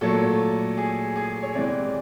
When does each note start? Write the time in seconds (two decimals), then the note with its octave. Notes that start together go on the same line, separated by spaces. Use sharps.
0.01 A#2 F#3 A3 A4
0.77 G#4
1.16 G#4
1.42 C#5
1.55 C3 E3 G#3 D5